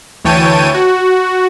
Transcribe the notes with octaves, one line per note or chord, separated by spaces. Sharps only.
D2 E3 C#5 G5 A5 D#7
F#4